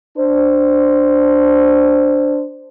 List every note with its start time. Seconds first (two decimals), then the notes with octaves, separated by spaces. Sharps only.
0.17 D4 C5